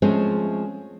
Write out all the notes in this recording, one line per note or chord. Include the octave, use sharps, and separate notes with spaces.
F3 G#3 A3 C4 C#4